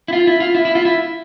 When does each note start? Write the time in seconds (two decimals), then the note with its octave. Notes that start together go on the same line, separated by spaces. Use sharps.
0.08 E4
0.13 F4
0.27 E4
0.40 F4
0.55 E4
0.65 E4
0.75 F4
0.85 E4